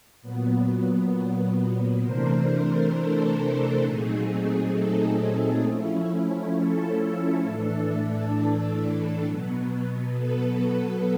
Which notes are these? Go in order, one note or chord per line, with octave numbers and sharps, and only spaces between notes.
A#2 F#3 B3
C3 E3 A3 D4 A#4 C5
A4
A#2 F#3 A3 C4 D#4 G#4
A4
F3 A3 C#4 E4
A4
A2 E3 A3 D4
B2 F#3 B3
A4 B4